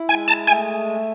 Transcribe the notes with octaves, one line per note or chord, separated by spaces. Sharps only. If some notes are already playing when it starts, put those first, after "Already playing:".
Already playing: E4
G#3 G#5
A5
A3 G#5